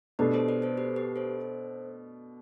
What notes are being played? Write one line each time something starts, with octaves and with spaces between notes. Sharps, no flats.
B2 A3 D4 G4 B4
A4 C5
B4 D5
A4 C5
G4 B4
G4 B4
A4 C5